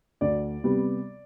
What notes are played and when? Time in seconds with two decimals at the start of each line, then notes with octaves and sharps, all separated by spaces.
0.21 D2 D5
0.63 C3 G3 B3